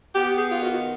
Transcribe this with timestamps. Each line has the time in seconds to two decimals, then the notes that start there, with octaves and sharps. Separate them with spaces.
0.14 B3 G4
0.38 G#4
0.51 F4
0.61 D#3 F#4